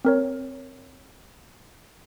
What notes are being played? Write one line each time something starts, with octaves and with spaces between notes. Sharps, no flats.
C4 A#4 C#5